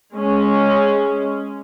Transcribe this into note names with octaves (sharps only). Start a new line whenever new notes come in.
G#3 C#4